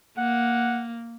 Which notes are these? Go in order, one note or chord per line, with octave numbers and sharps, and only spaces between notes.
A#3 F#5